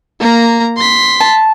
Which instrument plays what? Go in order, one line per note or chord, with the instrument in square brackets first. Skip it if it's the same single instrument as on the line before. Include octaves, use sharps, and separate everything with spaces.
[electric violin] A#3 A#5
C6 B6
[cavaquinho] A5